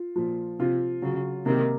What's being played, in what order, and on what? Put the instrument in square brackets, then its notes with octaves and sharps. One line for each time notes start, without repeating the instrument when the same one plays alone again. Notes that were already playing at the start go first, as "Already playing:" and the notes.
Already playing: [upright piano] F4
[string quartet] A#2 [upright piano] F3
[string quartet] C3 [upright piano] F4
[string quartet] C#3 [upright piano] F#3
[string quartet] C3 D#3 [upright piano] A#3